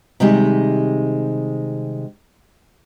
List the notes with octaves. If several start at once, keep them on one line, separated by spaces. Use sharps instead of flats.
C3 D#3 G3 G#3 G4